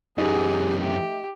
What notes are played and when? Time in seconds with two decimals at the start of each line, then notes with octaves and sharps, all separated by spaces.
0.18 F#2 E3 D#4 G4 G#4
0.81 A3 G4